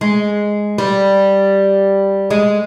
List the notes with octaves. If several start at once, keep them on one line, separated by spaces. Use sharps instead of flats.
G#3
G3
G#3